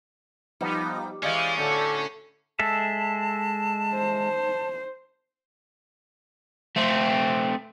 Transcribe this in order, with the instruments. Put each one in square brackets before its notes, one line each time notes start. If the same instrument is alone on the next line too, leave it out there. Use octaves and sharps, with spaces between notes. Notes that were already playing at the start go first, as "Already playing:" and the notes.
[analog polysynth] F3 B3 D#4 [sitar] G3
[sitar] E3 G#3 [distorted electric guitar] C#4 [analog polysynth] D5 C#6 G6 [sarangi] F5
[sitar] A2 D3 F#4 [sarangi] A4
[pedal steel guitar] G#3 A4 E5 [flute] A5
[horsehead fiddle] C5
[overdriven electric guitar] A3 C4